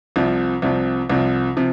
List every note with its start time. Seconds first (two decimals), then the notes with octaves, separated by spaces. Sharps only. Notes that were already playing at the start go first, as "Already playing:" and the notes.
0.16 C2 C3 F3
0.62 C2 C3 F3
1.10 C2 C3 F3
1.57 C3 F3